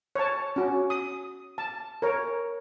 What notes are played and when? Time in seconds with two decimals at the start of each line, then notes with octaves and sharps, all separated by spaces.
0.15 C#5 A5
0.56 C#4 F#4
0.90 D#6
1.58 A5
2.02 A#4 C#5